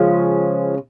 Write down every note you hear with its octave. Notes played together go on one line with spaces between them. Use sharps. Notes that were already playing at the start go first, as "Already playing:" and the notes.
Already playing: C#3 F3 G#3 C#4